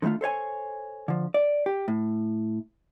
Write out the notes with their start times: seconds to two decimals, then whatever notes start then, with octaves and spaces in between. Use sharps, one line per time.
0.02 D3 D#3 F3 A3 F4
0.21 A4 C5 C#5 G#5
1.08 D3 F3
1.34 D5
1.66 G4
1.88 A2